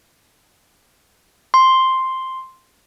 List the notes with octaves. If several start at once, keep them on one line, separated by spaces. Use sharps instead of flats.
C6